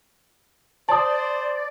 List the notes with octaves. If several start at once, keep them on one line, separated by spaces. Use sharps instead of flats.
C5 D5 A5 D#6